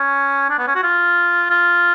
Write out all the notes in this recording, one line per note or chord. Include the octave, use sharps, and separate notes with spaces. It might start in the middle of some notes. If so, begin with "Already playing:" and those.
Already playing: C#4
D4
B3
C#4
F#4
F4
F4